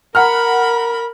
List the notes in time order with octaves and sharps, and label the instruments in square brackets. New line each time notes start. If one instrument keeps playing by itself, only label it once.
[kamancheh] A#4 B5 [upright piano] F#5 A#5 F6